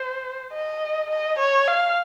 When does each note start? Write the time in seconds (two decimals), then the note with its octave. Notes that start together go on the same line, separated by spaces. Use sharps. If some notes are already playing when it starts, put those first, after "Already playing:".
Already playing: C5
0.53 D#5
1.11 D#5
1.39 C#5
1.68 F5